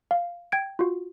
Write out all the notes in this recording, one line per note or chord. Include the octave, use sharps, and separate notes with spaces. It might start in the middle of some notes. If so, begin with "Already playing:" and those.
F5
G5 G#6 D7
F4 F#4